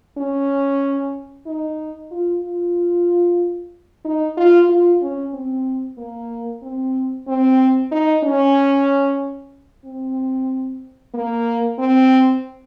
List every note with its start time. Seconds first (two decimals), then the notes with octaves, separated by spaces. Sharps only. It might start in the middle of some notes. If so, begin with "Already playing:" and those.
0.18 C#4
1.46 D#4
2.11 F4
2.44 F4
4.05 D#4
4.37 F4
4.69 F4
5.01 C#4
5.34 C4
5.98 A#3
6.63 C4
7.28 C4
7.92 D#4
8.24 C#4
9.85 C4
11.14 A#3
11.79 C4